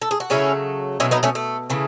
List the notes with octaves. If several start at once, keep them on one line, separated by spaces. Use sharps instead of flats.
A4
G#4
F#4
C#3 F#3 A3 C#4 E4
B2 F#3 A3 C#4 E4
B3 D#4
A3 C#4
A3
C#3 E3 A3